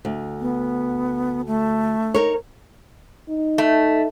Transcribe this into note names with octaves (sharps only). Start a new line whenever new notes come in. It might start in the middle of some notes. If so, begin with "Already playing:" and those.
D2
B3
A3
D#4 A#4 C#5
D#4
A3